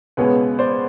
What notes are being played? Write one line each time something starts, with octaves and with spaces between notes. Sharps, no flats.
C#2 B2 G#3 B3 B4 C#5
C5 D5